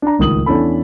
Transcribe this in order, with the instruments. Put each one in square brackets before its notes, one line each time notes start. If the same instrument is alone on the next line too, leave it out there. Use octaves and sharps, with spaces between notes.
[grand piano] D4 A#5
D1 C#2 D#3 D#6 F#7
E2 C#4 D4 E4 A4 B5